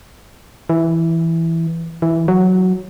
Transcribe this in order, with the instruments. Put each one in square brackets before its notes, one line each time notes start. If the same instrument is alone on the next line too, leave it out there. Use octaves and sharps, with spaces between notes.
[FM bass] E3
E3
F#3